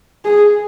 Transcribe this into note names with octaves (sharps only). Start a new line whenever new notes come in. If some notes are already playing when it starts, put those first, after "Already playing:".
G#4